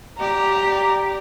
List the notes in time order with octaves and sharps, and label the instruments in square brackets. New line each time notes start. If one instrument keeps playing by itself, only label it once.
[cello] G4 [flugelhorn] D5 [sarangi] A#5